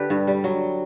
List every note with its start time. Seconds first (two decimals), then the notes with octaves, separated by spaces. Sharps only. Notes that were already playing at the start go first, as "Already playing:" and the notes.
Already playing: D3 G4 B4
0.10 G2
0.27 G3
0.44 F#3